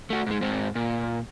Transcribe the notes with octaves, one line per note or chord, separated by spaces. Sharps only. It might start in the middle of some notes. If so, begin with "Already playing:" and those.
A3 F#4
G#2 G#3
G#2 C4
A#2